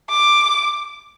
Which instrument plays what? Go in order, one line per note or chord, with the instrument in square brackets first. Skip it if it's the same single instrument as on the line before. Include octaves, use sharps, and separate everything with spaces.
[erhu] D6